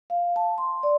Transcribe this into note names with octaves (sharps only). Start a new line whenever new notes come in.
F5
A5
C6
D5